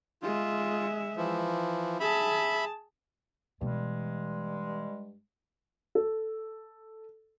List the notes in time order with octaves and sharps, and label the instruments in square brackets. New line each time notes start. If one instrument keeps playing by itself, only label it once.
[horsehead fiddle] G#3 E5 [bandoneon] F4
[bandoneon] E3 F3
[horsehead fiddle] G#4 A5 [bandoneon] E5 B5
[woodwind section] G2 G3 G#3 [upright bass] B2 E3
[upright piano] A4